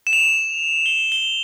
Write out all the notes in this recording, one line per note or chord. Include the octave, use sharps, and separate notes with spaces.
E7
F7
G7
G7